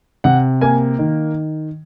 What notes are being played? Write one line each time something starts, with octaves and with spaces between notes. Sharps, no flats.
C3 F#5
A#3 G#5
D#3